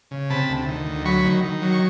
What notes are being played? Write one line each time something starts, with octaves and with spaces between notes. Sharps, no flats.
C#3
C3 A5 B5
D2
D#3
D2
F#3 B5 C#6
D#3
D#3
F#3
C#6